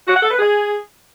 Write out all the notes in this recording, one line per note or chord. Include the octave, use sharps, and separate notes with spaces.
F#4
F#5
A4
B4
G#4